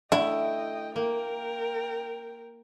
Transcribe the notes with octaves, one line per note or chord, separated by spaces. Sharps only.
D3 A3 E4 D#5 G5
A#3 A#4 G5